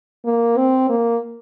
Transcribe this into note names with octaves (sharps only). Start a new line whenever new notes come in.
A#3
C4
A#3